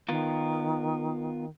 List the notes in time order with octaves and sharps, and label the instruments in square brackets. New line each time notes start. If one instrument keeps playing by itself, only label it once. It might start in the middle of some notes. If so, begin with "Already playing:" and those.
[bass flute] D#3 [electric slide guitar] B3 F4 A#4